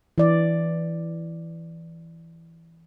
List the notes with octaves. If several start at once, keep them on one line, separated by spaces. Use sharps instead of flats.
E3 D5